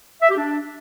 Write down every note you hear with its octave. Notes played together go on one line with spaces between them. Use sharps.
E5
G4
D4